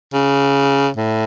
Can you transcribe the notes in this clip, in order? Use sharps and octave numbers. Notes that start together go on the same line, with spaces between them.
C#3
A2